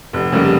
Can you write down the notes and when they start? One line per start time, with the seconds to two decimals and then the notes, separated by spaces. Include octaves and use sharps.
0.13 F1
0.32 F2 C#3 G3 A#3